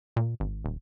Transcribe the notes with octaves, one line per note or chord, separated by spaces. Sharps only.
A#2
G#1
D#1